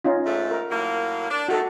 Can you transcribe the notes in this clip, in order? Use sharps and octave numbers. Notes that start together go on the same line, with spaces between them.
C#4 D#4 F4
G#2 A3
A#4
A2 F#3 A#3
D4
D#3 A3 F#4 A4